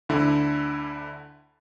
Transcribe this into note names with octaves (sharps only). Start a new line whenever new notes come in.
D2 D3 E4